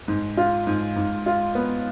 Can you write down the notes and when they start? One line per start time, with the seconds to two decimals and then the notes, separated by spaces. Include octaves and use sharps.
0.08 G#2
0.37 F4
0.67 G#2
0.96 G#2
1.26 F4
1.55 B3